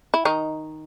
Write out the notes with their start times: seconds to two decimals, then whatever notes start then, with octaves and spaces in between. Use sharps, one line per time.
0.14 E4
0.25 D#3 D#4